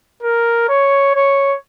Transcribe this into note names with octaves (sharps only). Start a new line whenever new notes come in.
A#4
C#5
C#5